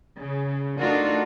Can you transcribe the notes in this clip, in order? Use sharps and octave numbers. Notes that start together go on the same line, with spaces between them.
C#3
A3 D4 D#4 F4 F#4 A#4